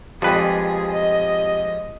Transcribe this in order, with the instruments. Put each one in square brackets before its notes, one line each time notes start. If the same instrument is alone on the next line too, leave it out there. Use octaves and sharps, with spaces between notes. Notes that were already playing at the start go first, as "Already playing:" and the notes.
[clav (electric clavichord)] F2 B4 [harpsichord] F3 G3 G#3 [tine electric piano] G4 [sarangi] G#4
[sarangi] D#5